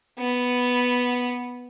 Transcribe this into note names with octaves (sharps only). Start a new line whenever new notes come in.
B3